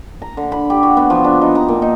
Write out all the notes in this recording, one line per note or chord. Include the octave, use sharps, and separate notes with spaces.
A#5
D3
B5
G4
F#4
B3
F3
D4
D#4
A#5
A#2
D#4